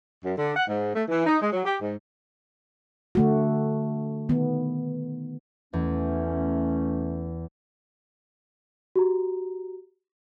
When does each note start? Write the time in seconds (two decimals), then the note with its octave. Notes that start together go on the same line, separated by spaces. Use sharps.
0.23 F#2
0.37 D3
0.55 F#5
0.67 G#2
0.94 A3
1.08 E3
1.25 D#4
1.40 G#3
1.51 F#3
1.64 G4
1.81 G#2
3.15 D3 A3 F#4
4.29 D#3 B3
5.73 E2 A3 C#4
8.96 F#4 G4 A#5